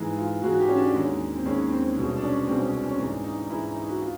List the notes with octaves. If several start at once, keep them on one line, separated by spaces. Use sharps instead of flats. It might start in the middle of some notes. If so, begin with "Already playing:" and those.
Already playing: G#2 E3 G#3
F4
G#2 E3 G#3 F#4
F#4
G4
C#4
D4
D#2 D#3 G#3
C4
D#2 D#3 G#3 C#4
C4
C2 B2 G#3 C4
D4
C#4
C2 B2 G#3 C4
C#4
C#4
G#2 E3 G#3 D4
D#4
D#4
G#2 E3 G#3 E4
D#4
F#4
F4